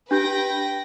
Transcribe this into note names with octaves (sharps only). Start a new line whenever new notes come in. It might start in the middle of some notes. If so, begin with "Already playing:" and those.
D4 G4 B4 G5 G6 A#6